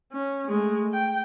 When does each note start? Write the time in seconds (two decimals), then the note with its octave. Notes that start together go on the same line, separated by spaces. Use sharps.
0.13 C#4
0.48 G#3 A3
0.93 G5